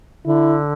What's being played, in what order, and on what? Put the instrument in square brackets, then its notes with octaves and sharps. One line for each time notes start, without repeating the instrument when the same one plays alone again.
[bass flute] D3 [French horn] E4